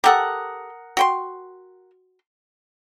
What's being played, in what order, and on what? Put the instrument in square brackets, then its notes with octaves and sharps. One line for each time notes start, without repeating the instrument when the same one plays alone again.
[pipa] G4 A4 [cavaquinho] A#4 F#5 D#6
[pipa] F#4 G5 C6